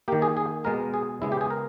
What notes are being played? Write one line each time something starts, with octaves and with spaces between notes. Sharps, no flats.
D#3 A#3 G4
G#4
G#4
B2 G#3 B3 A#4
G#4
C#3 G#3 B3 E4
G4
G#4
A#4